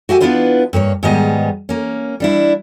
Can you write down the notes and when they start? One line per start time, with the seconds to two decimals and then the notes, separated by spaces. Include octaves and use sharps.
0.09 F#4 G4 E5 G#5
0.20 B3 D4 E4 F4 B4 C5
0.73 G2 A#3 B4 C#5
1.03 G#2 D#3 G3 G#3 B3 D#5
1.69 A#3 C#4
2.20 G3 D4 E4